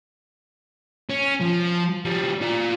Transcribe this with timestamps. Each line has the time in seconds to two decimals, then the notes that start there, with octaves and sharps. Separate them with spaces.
1.09 C#4
1.41 F3
2.05 F3 G3
2.41 F4 D5